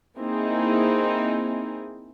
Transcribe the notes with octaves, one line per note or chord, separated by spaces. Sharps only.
A#3 C4 D#4 E4 G#4